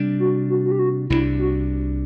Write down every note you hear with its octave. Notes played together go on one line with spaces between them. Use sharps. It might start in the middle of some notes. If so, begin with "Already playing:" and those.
Already playing: C3 G3 D4
F#4
F#4
F#4
G4
F#4
C2 C3 G3 D4 E4
F#4